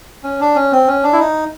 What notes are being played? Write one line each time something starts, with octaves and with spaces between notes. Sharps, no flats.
C#4
D4
C#4
C4
C#4
D4
E4
D#4